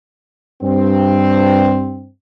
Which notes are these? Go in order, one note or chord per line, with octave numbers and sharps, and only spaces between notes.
G2 C4